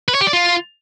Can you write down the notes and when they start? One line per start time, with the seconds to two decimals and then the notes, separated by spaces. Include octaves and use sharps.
0.08 B4
0.15 C#5
0.21 G4
0.27 D5
0.33 F4